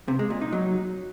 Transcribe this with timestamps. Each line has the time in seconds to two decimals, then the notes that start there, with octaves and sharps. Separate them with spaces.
0.08 C3
0.19 G#3
0.30 A#2
0.41 D#4
0.53 F#3